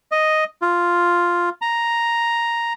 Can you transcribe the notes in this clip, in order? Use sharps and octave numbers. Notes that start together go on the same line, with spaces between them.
D#5
F4
A#5